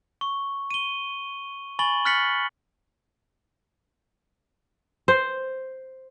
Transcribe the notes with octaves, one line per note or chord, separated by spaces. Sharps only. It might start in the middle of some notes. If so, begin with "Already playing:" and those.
C#6
D#7 G7
G#5 B5 C#6 A6 F#7 G7
F6 F#6 A6 B6 C#7 F#7
C5